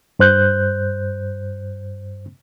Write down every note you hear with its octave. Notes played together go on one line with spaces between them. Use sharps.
G2 C5 F#6 G6